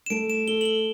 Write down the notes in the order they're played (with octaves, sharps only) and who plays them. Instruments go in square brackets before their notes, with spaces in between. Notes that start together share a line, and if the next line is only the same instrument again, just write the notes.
[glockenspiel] E7
[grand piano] A3 [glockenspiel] D7
[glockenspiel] E7
[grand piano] A4 [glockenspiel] G7
[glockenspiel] F#7
G7